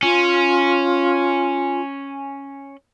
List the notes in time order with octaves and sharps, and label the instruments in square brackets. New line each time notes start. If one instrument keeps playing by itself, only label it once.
[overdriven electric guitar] C#4 [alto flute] F4